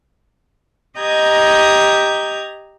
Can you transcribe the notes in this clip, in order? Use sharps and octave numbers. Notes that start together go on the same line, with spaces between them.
G4 D#5 A#5 G6 G#6